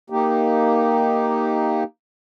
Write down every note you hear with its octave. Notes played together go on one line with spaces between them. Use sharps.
A#3 D#4 G4